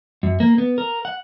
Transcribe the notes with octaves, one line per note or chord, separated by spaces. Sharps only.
F#2
A#3
B3
A#4
F#5